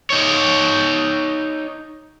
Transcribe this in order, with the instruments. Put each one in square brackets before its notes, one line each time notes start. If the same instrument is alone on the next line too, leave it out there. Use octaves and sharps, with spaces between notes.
[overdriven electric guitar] D#4 C#5